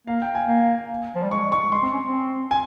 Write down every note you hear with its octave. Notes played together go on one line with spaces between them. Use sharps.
A#3 F5
G5
G#5
A#3
F3
G3
G#3 C#6
C#6
G#3 C6
C4
C#4
C4
G#5